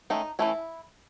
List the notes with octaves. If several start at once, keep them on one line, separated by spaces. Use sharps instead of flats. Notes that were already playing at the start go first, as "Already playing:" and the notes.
D#3 A3 C#4 D#4
E3 A3 C#4 E4